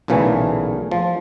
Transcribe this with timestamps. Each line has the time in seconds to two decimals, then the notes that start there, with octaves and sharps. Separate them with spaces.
0.08 B1 A#2 C#3 E3 A3
0.91 F3